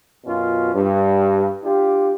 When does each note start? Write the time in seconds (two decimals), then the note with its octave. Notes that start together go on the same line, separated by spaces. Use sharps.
0.25 F#2 B2 C#4 F4
0.75 G2
1.64 D4 F4 G4